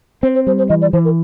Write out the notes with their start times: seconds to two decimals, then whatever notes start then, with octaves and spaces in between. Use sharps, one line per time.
0.23 C4 C5
0.35 C5
0.47 G3 C5
0.58 C5
0.69 E3 D#5
0.82 D5
0.93 E3 C5
1.05 A#4